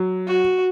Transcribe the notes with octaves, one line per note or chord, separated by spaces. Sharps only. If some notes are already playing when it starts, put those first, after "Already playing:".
Already playing: F#3
F#4